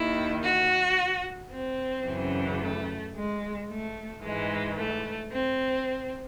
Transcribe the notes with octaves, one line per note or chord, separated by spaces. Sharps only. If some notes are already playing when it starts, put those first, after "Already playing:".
Already playing: D#2 D#3 E4
F#4
C4
F#2 C#3 E3
A3
G#3
A3
G#2 E3 G#3
A3
C4